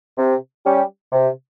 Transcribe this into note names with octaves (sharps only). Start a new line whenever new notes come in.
C3
G3 C#4 G4
C3